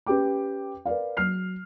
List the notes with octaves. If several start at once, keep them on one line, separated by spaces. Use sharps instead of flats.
C#4 G4 B4 G5 D6
A#4 B4 D5 F5
F#3 F6 C7